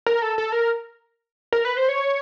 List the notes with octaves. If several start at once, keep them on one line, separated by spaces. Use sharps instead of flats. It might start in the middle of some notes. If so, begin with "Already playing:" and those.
A#4
A4
A4
A#4
A#4
B4
C5
C#5